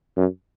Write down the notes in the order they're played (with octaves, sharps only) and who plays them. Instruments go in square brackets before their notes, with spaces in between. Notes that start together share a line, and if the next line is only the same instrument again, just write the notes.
[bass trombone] F#2